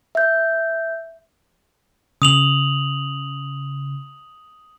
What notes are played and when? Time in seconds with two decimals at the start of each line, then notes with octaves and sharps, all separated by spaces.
0.15 E5 G6
2.22 C#3 D#6 F7 F#7